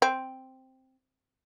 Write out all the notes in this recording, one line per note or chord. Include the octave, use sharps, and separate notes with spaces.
C4